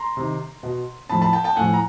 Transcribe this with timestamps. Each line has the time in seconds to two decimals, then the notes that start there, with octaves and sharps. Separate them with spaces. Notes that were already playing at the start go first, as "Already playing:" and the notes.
Already playing: A#5 C6
0.17 C3 D#3
0.63 B2
1.09 A2 F3 A5 B5
1.22 A5 B5
1.33 G5 A5
1.44 G5 A5
1.56 A2 F3 F#5 G#5
1.74 A#5